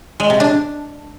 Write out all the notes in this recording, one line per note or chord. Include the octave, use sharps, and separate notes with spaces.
G#3
C3
D4